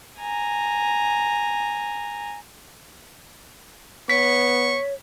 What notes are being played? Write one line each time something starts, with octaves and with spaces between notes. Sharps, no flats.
G#5 A#5
B3 C#5 C#6 B6